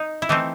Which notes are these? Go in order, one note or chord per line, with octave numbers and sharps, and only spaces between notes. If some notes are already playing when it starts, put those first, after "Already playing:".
Already playing: D#4
E4
E3 A3 C4 D#4